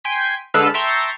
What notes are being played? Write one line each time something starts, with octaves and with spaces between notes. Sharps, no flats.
G5 G#5 C6 B6
D3 G#3 A4 B4 F5 E6
E5 G5 A5 A#5 C6 C#6